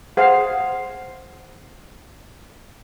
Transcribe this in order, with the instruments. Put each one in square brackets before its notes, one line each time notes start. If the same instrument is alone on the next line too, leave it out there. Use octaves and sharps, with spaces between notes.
[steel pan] G#4 C5 F5 [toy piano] F#5